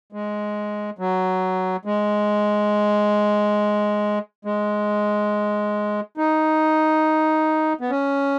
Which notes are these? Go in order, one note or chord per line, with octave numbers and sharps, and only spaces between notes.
G#3
F#3
G#3
G#3
D#4
B3
C#4